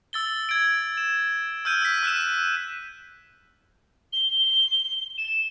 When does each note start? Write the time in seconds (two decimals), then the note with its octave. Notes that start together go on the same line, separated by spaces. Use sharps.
0.13 E6 A6 G7
0.49 G#6 D7
0.97 E7
1.65 E6 F6 G6 D#7
1.82 E6 B6
2.03 E6 F#6 D#7 E7
4.13 G7
5.18 E7